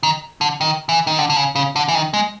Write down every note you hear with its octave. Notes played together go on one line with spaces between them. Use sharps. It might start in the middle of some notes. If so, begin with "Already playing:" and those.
D#3
D3
D#3
E3
D#3
D3
D3
C#3
C#3
D3
E3
D#3
G#3